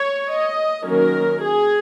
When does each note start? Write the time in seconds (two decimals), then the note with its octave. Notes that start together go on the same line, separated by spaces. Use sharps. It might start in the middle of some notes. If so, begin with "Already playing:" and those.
Already playing: C#5
0.29 D#5
0.85 D#3 F#3 A#3 C#4 A#4
1.42 G#4